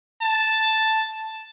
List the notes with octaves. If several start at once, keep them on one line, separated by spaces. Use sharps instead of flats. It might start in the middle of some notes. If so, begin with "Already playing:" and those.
A5